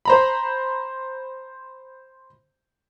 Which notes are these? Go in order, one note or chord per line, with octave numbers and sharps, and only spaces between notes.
C5 A#5 B5